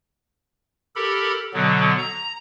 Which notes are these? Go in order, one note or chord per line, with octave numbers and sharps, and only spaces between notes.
G4 A4 A#4 B5
B2 D3 F#3 B3
A#5